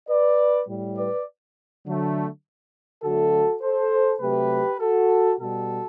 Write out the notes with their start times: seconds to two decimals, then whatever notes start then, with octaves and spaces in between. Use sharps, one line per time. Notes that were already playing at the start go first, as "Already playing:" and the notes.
0.08 B4 D5
0.68 A2 G3
0.97 B4 D5
1.86 D3 F#3 A3
3.03 D3 F#3 A3 F#4 A4
3.62 A4 C5
4.20 C3 F#3 A3 G4 B4
4.80 F#4 A4
5.39 B2 G3 F#4 A4